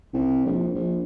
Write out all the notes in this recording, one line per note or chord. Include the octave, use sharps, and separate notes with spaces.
C2
A#1
A#1